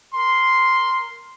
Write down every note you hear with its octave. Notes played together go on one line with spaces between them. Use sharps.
A#4 C6